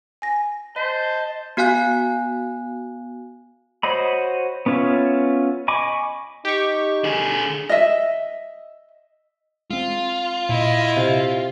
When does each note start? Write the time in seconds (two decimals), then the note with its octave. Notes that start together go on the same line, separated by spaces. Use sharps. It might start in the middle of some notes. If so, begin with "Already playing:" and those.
0.22 G#5 A#6
0.76 C5 D#5 A5 B6
1.57 B3 F#4 F5 G#5 F#6
3.83 F#4 C5 C#5 D#5 B5
4.66 B3 C#4 F4 C#5 E5
5.68 D#5 G#5 B5 C#6 D6
6.45 D#4 G4 C#6
7.04 D3 G#4
7.69 D#5 E5
9.70 G#3 C4 F4
10.49 A#2 E4 D#5
10.97 C3